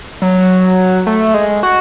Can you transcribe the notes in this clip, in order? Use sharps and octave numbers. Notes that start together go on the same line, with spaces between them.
F#3
A3
G#3
F#4